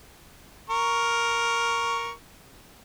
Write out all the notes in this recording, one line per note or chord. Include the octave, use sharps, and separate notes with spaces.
A#4 C#6